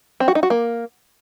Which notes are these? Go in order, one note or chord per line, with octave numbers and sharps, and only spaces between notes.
C4
F#4
D#4
F#4
A#3